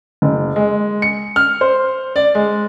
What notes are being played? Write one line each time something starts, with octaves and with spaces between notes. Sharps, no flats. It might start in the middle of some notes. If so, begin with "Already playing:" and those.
F#1
G#3
C#7
F6
C5
D5
G#3